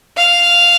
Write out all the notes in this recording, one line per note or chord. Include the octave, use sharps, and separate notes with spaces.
F5